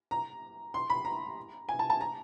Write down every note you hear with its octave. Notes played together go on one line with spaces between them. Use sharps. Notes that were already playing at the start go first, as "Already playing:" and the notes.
A#5
C6
B5
A#5
G#5
A5
A5
A#5